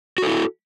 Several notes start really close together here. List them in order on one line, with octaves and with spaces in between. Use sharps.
F#4 A4 E4